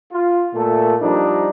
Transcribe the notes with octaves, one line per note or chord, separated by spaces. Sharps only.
F4
A#2 A3
F3 G3 D4 D#4